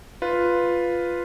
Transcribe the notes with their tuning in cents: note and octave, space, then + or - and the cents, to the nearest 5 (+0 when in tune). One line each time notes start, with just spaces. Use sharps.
F4 +0 B4 +0